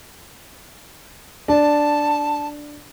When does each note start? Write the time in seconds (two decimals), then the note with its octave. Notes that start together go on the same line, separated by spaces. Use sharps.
1.48 D4 A5